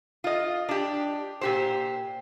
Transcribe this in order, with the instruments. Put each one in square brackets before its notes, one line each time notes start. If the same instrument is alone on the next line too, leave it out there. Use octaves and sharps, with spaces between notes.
[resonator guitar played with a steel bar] F4 D#5
D4 G4
A#2 G4 C5